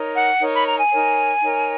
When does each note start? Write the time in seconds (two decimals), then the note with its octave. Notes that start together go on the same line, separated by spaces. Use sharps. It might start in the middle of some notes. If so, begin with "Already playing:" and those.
Already playing: D#4 A#4 C#5
0.16 F#5
0.41 D#4 A#4 C#5
0.54 B5
0.66 A#5
0.79 G#5
0.92 D#4 A#4 C#5
1.42 D#4 A#4 C#5